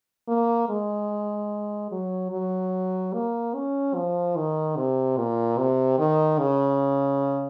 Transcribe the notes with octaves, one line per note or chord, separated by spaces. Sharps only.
A#3
G#3
F#3
F#3
A#3
C#4
F3
D#3
C3
A#2
C3
D#3
C#3